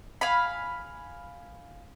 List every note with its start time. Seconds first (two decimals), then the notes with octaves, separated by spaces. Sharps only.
0.21 F5 G#5 B5